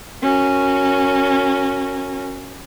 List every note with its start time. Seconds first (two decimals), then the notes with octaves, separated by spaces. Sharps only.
0.23 C#4 F#4 A#4